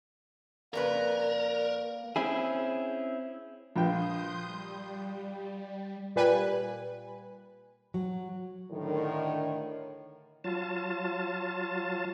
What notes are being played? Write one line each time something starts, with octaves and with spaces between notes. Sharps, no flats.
F2 C#3 A#3 A#4 B4 D5
C4 C#4 E4 G#4
A#1 G5 C6 D#6 G6
G3
A#2 G3 B4 G#5
F#3
A2 D3 D#3
F#3 F4 A5